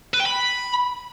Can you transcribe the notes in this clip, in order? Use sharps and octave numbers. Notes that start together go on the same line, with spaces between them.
B4
G5
B5